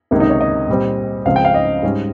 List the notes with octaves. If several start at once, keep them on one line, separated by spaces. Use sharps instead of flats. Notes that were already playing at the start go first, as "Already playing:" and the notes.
C#2 C3 D#3 A#3
D#4
C#5
D#5
A#2 G3 C4
C#2 C#3 F3 C4 F5
G5
F5
D#5
G#2 G3 C#4